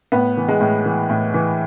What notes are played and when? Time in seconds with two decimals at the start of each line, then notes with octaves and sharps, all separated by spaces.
0.12 A2 B3
0.37 E3
0.48 G#3
0.60 A2
0.85 E3
1.10 A2
1.34 E3